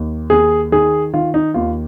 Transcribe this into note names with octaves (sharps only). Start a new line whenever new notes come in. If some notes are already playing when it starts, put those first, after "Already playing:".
Already playing: D#2
D#2 G#4
D#3 G#4
D#3 F4
D#4
D#2 F4